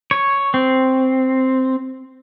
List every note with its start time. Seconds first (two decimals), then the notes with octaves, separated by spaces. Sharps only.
0.11 C#5
0.54 C4